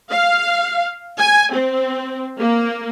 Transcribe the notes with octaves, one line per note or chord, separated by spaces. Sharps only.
F5
G#5
C4
A#3